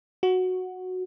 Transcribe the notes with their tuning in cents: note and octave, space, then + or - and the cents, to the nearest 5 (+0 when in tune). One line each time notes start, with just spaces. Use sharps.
F#4 -5